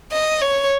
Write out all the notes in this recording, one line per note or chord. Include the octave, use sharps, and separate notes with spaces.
D#5
C#5